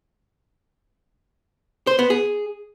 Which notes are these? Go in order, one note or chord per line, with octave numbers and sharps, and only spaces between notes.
C5
B3
G#4